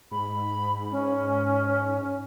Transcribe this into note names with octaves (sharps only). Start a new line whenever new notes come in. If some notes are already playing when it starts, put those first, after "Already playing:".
G#2 B5
C#4